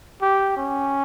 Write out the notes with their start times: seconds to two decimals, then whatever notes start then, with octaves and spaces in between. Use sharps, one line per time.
0.22 G4
0.57 C#4